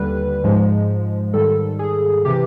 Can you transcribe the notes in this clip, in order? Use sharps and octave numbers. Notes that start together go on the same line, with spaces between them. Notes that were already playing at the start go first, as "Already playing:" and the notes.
Already playing: D#2 D3 G3 B4
G#2 F3 G#3
G#2 D#3 G3 A4
G#4
C3 E3 G4